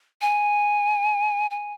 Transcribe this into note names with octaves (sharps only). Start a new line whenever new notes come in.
G#5
G#5